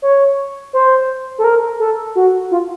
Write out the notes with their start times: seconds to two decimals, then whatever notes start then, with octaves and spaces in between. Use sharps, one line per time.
0.02 C#5
0.73 C5
1.38 A4
1.44 A#4
1.80 A4
2.15 F#4
2.51 F4